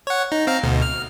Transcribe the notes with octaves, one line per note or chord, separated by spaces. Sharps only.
C#5 F#5
D#4
C4 F5 A#5
D2 B2
F6